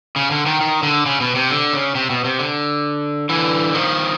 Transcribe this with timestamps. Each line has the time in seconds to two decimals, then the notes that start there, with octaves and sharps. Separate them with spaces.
0.16 C#3
0.31 D3
0.46 D#3
0.61 D#3
0.83 D3
1.06 C#3
1.21 B2
1.35 C3
1.50 D3
1.73 C#3
1.95 C3
2.10 B2
2.24 C3
2.39 D3
3.29 D3 E3
3.74 D#3 F3